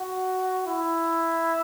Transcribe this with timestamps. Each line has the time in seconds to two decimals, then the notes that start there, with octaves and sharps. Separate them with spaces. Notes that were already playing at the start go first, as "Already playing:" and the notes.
Already playing: F#4
0.66 E4